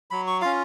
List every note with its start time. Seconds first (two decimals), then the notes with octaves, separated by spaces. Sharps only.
0.11 F#3 B5
0.27 C#6
0.41 C#4 F4 F5